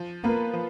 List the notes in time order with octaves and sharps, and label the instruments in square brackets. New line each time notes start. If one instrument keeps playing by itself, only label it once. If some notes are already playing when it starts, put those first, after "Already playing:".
Already playing: [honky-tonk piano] F3
[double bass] A#3 [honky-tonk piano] B3 F4 B4
[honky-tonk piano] F3